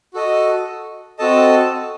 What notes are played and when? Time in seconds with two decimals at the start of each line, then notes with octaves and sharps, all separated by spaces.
0.14 F#4 A4 D#5
1.19 C4 F#4 A4 D#5 A5